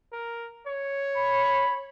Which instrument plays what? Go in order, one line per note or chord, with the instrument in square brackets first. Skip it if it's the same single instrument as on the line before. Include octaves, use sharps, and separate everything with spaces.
[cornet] A#4
C#5
[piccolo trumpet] B5